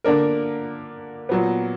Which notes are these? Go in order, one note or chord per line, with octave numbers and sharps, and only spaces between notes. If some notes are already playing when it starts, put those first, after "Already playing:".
D3 A#3 D4 A#4
A#2 F#3 B3